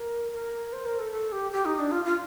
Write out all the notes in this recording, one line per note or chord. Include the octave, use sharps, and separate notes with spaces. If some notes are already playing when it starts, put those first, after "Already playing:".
Already playing: A#4
A#4
C5
A#4
A4
A4
G4
G4
D#4
D4
F4
F4